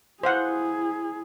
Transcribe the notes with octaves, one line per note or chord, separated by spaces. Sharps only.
E4 G#4 C5 F5 F#5